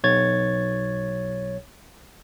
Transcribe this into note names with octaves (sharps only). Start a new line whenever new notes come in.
B1 C#5 G#6 A6